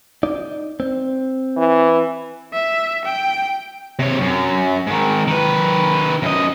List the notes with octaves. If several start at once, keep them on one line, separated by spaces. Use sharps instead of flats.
D#4 D5
C4
E3
E5
G5
C3 C#5
F#2
G#2 D#3
D#3 B4
F#2 D#5